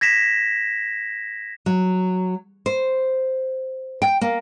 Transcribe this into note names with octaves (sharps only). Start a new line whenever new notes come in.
G#6 A#6 B6 E7
F#3
C5
G5
A#3